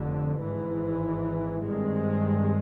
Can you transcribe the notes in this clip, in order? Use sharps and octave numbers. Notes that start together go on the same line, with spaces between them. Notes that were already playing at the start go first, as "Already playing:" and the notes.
Already playing: F1 F2 D3
G#1 G#2 E3
G2 D#3 G#3 C4